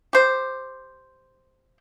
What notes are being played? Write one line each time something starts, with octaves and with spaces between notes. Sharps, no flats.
G4 C5